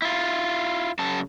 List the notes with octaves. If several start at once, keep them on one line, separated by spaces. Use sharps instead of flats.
E4 F4
F#2 C#3 A5